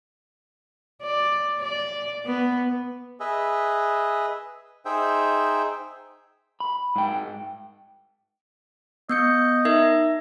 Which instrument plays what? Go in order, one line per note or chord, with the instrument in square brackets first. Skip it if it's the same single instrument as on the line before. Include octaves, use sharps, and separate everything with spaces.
[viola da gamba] D5
D5
B3
[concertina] G#4 B4 D#5 E5
D#4 G#4 C5 E5 G5
[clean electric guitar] B5
G#2 G5
[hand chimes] B3 G6 C#7 [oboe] D#5
[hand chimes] D#4 A#4 E5